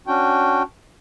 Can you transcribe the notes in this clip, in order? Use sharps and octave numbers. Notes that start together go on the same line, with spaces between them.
C#4 D4 F#4 G5